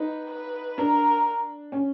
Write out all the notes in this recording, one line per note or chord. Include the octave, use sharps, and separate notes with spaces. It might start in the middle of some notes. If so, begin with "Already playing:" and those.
Already playing: D#4 B4
B4
D4 A#4
C#4